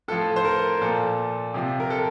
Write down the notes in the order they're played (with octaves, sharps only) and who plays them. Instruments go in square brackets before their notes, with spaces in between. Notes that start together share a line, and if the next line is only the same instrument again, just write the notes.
[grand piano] A2 F3 A4
C5
A#4
A#2 F3 A4
C3 F3
A#4
A4